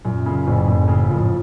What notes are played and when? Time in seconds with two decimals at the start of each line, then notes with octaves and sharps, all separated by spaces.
0.05 F#2 A#2
0.26 C#3
0.47 F#1 A2
0.68 F#1
0.88 C#3
1.10 F#2 F3
1.21 A2